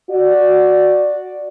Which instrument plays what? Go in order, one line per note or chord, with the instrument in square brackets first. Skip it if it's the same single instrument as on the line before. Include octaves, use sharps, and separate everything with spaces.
[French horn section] F#4 D5